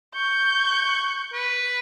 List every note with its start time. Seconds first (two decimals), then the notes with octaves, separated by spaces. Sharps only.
0.15 C#6 G6
1.33 B4